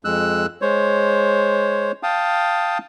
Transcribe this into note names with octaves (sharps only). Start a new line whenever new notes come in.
F2 G#3 E6 F#6
G#3 C5 C#5
F5 G5 A5 D#6